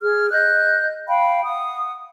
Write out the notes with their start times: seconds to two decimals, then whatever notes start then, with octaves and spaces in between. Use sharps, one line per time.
0.02 G#4 F6
0.31 D#5 F#6 G6
1.08 F5 G5 B5
1.43 F#5 D#6